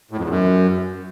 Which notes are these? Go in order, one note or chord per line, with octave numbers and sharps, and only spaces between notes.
A2
F2
E2
F#2